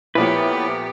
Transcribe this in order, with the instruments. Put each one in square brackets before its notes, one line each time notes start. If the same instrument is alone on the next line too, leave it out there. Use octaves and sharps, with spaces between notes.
[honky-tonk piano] A#2 F3 A3 [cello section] B3 G4 [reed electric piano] E4 C#5 [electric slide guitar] B4